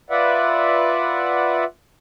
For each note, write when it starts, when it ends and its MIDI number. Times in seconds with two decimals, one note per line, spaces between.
0.10 1.64 65
0.10 1.64 71
0.10 1.64 74
0.10 1.64 76
0.10 1.64 78